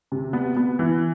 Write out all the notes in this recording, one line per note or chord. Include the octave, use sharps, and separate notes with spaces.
C3
B3
B3
E3